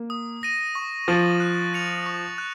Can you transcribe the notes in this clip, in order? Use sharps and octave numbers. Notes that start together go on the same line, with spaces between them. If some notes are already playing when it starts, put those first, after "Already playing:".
Already playing: A#3
D#6
A#6 D#7
C#6
F3 A6 D#7 F#7
F#6
A6 C#7 F7
C#6
F#6